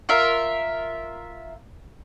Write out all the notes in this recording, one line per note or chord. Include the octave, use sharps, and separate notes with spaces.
F4 A#4 E5